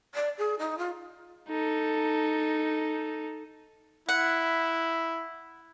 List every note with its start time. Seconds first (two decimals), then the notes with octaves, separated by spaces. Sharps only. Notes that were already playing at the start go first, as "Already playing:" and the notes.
0.15 D5
0.38 G#4
0.59 D#4
0.78 F4
1.49 D#4 A4
4.09 E4 F#5